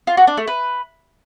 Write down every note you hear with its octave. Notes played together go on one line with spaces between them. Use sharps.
F4
F#4
D4
A3
B4